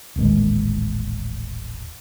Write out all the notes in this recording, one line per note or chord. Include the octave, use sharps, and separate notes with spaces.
D#1 A1 D#3 G#3